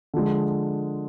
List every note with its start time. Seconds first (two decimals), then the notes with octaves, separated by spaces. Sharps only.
0.14 D3 F3 G#3